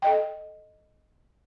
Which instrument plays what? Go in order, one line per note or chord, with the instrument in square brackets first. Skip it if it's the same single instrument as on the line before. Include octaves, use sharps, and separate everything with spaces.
[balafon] A4 D#5 G5